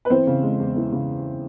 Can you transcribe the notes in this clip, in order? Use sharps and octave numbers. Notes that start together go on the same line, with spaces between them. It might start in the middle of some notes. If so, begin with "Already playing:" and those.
B4
E3 C4 C5
C#3
G#3
E2
E3
C#3